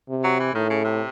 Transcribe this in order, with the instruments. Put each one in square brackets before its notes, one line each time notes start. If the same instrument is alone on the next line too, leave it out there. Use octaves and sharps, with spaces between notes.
[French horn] C3
[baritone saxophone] F#3
E3
[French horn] A2 [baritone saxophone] D#3
[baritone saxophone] C#3
C3